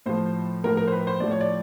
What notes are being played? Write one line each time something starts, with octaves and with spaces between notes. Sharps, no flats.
A2 F3 C5
A2 F3 A#4
A#4
C5
B4
C5
A2 F3 D5
C#5
D5